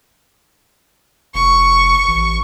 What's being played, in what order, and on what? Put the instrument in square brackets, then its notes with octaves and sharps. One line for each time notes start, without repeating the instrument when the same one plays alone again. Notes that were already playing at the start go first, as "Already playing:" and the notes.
[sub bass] F1 [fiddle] C#6
[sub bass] A1